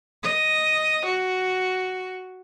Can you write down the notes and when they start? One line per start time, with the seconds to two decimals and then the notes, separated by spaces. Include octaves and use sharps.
0.23 D#5
1.06 F#4